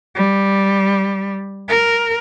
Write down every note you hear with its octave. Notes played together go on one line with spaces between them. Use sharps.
G3
A#4